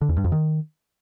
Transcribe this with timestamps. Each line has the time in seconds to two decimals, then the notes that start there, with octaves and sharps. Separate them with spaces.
0.01 D3
0.09 E2
0.17 G2
0.24 F2
0.32 D#3